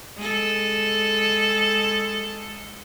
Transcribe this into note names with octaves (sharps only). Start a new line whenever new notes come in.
G#3 A4